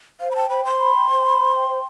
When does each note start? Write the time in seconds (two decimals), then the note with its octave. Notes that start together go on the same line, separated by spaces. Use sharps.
0.20 C5 F5
0.31 B5
0.35 G5 A5
0.50 C5 B5
0.65 C5 C6
0.79 B5
0.95 G5
1.10 C5
1.24 B5
1.39 C5
1.54 G5
1.69 C5